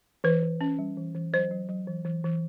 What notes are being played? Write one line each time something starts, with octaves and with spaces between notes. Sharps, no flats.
E3 B4
E3
C#4
G3
E3
E3
F#3 C5
F#3
F#3
E3
E3
E3